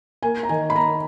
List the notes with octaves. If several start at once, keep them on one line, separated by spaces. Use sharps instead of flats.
A#3 G#5
A#5
D#3 G#5
B5
A#3 A#5